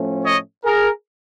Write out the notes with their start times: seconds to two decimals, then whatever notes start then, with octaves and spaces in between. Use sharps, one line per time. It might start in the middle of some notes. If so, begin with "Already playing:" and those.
Already playing: A2 F3 A3 C#4
0.23 C#5 D#5
0.64 G#4 A#4